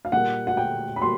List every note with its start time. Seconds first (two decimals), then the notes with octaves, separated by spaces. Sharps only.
0.05 F5
0.12 A#2 G3 A#3 F#5
0.47 F#5
0.57 G5
0.96 B5
1.02 G3 A#3 C6